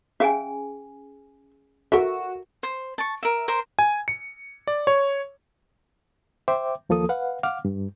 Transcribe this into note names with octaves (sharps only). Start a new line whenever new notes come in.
C#4 G#4 E5 F5 G5 G#5
F#4 A4 A#4 E5
C5
A5 C#6
A#4 E5
A#4 C5 C6
G#5
C#7
D5
C#5
C5 E5 G5 D6
D#2 F3 A#3 A4 D#6
B4 F5 F#5
F5 F#5 D6 F6
G2